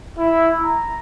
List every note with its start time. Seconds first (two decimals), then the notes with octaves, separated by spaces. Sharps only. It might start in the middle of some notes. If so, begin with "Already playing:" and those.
0.18 E4
0.61 A#5